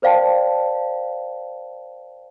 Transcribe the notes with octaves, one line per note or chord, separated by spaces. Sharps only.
A#4 C5 D5 F5 G5 A5